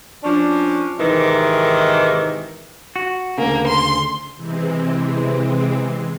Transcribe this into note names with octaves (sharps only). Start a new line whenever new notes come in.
F3 C#4 D4
G#2 C3 D#3 E3
F#4
D2 C#3 A#3
C6
C3 E3 G#3 C4